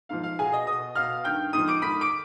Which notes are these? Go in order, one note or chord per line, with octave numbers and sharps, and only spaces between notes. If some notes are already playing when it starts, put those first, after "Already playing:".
G#2 F3 F5
F5
B2 G#4 G#5
D#5 D#6
B2 D#5 D#6
B2 F5 F6
G2 D#3 G5 G6
G#2 F3 D#6 D#7
D6 D7
G#2 D#3 B5 B6
D6 D7